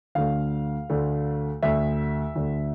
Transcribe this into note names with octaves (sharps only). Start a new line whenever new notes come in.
D2 D3 A3 F5
D2 D3 A3
D2 D3 A3 E5
D2 D3 A3